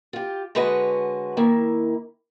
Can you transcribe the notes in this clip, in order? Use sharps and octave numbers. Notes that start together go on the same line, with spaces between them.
F4 G4
D3 G#3 F#4 B4 C#5 D#5
D#3 A#3 E4